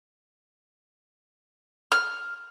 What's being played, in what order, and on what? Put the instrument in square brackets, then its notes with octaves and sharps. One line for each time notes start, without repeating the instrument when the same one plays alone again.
[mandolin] F6